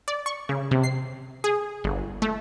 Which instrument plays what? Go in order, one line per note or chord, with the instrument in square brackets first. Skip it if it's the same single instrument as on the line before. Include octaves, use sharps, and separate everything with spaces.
[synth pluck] D5
C#6
C#3
C3
C7
G#4
G1
A3